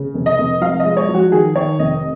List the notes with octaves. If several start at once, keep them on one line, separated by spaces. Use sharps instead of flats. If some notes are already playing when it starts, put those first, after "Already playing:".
Already playing: C#3
F1
D#5
F1
F3 F5
D#5
G#3
C#5
F3
F#4
D#3 G#4
D#3 C#5
F1 D#5